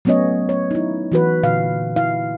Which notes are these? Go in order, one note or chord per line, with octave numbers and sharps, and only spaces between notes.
F#3 A3 B3 C#4 C#5 D#5
C#5
D#4 E4
E3 F#4 B4
A#2 D3 F5
E4 F5